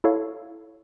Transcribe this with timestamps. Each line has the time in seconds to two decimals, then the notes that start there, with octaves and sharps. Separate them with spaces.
0.04 E4 A4 C#5 F5